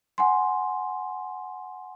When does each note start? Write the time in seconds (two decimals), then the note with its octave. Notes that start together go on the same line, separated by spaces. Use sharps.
0.18 F#5 G#5 C6